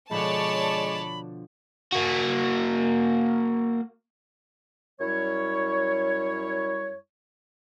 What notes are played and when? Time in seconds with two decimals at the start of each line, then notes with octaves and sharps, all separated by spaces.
0.11 B2 D3 F3 G#3 C#5 D5 A5 B5
1.93 A#3 F#4
5.00 F#2 G3 E4 C#5